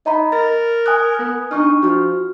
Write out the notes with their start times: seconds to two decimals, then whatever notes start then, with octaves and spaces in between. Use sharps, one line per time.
0.06 D#4 D#5 A#5 B5
0.32 A#4 A6
0.86 G#5 D#6 F#6
1.19 B3
1.51 D4 D#4 C#6 F6
1.83 F3 F#4 F6